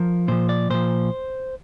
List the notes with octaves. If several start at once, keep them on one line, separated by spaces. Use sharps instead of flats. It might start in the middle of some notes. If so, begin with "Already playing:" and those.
Already playing: F3 A#4
A#2 F3 C5
D5
A#2 F3 C5